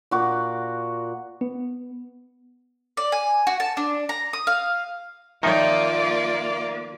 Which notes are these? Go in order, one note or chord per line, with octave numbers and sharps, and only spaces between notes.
A#2 F#4 D6
B3
D5
G#5
F#4
A5
D4
A#5
D#6
F5
D#3 F3 A#3 D#4 F4 D5 E5